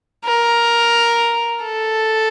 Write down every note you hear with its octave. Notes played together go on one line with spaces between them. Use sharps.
A#4
A4